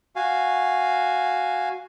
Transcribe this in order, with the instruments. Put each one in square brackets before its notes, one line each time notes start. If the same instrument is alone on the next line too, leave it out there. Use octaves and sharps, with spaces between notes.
[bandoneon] F#4 F5 G#5